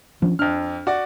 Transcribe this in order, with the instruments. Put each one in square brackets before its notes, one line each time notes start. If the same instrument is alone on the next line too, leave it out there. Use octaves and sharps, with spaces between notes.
[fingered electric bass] F3 C#4 D4
[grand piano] F2 F6 [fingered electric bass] D4
[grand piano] F#4 D5